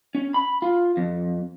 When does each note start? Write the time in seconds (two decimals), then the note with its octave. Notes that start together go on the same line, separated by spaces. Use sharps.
0.15 C#4
0.34 B5
0.62 F4
0.97 F2